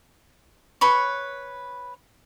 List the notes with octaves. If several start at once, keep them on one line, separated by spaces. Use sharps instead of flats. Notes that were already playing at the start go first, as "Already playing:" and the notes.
B4 C#5 B5 C#6